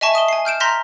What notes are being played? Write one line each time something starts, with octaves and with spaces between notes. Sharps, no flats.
D#5 E5 G#5 A5 C#6
E5 D#6 E7 G7
G#5 C7
F6 G6 D7 E7
A#5 C6 F6 G6 A#6 B6